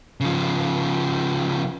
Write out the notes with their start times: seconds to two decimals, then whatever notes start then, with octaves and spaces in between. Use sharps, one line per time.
0.21 C#3 F3